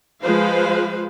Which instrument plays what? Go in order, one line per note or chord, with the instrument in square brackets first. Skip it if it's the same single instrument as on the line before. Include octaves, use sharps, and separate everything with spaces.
[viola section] F3 G#3 F4 B4 C5 F5